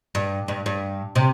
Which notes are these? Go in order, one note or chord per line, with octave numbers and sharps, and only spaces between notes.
G2
G2
G2
C3